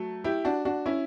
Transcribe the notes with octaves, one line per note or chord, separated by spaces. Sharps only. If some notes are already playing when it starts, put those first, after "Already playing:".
Already playing: F#3 A3
E4 G4
D4 F#4
D4 F#4
C#4 E4